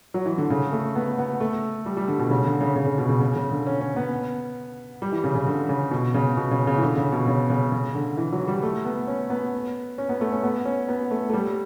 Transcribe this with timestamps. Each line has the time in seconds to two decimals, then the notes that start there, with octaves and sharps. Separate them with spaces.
0.14 F#3
0.26 E3
0.38 D3
0.50 C#3
0.72 A3
0.95 B3
1.18 B3
1.40 A3
1.86 G3
1.97 G3
2.08 D3
2.19 B2
2.30 C#3
2.46 D3
2.61 C#3
2.76 C#3
2.87 C#3
2.98 B2
3.09 C#3
3.21 C#3
3.36 C#3
3.51 D3
3.66 C#4
3.81 C#4
3.96 B3
5.02 G3
5.12 E3
5.24 C#3
5.35 C#3
5.47 D3
5.69 C#3
5.91 B2
6.14 C#3
6.37 B2
6.51 C#3
6.67 C#3
6.78 E3
6.82 D3
6.97 C#3
7.12 B2
7.27 C#3
7.50 C#3
7.72 C#3
7.95 D3
8.17 E3
8.32 F#3
8.47 G3
8.63 A3
8.85 B3
9.07 C#4
9.30 B3
9.98 C#4
10.09 B3
10.21 A3
10.32 C#4
10.43 B3
10.65 C#4
10.88 B3
11.11 A3
11.29 A3
11.33 G3